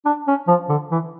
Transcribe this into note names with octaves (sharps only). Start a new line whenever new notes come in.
D4
C#4
F3
D3
E3